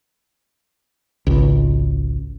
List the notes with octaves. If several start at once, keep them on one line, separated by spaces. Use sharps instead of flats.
G#1 C#2